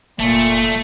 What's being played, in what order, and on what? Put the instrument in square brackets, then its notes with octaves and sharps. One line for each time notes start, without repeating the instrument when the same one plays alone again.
[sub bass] F1 [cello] A#2 [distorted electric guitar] A3